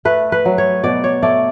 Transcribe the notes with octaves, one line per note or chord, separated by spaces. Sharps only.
A3 B4
B4
F#3
C#5
B2 D5
C#5
A3 D5